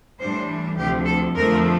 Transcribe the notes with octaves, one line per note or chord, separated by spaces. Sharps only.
A2 E3 G3 D4 C5
D2 C3 F3 G4
A4
F2 D3 F3 A3 A#4